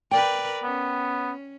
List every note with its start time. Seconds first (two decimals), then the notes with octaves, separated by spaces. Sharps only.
0.11 A#4 B4 D5 G5
0.63 B3 C#4